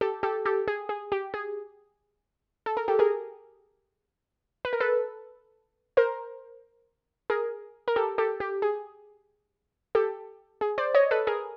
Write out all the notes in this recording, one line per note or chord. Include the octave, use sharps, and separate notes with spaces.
G4 A4
G4 A4
G4 A4
G#4
G#4
G4
G#4
A4
A#4
G4 A4
G#4 A#4
B4
A#4
A4 B4
A#4 C5
G#4 A#4
A#4
G4 A4
G4 A4
G4
G#4
G4 A4
G#4
C5 D5
C#5 D#5
A4 B4
G#4 A#4